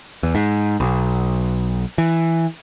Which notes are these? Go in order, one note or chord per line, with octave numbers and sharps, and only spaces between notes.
E2
G#2
B1
E3